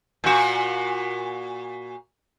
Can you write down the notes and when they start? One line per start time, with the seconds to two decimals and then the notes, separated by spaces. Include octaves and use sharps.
0.24 A#2 F#4